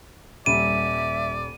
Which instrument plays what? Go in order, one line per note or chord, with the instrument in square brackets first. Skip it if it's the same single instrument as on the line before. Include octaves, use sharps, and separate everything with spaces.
[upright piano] D#1 G3 [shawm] D5 [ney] E5 [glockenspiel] D#7